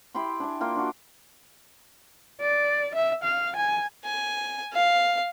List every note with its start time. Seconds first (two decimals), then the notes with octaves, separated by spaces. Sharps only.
0.15 E4 G4 B5 C6
0.40 D4 G#5
0.61 A#3 F4 G5
0.76 D4 F#4
2.41 D5
2.95 E5
3.23 F5
3.56 G#5
4.05 G#5
4.73 F5